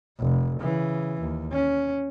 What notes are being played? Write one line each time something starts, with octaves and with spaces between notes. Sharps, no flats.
F1
C#3 E3
D#2
C#4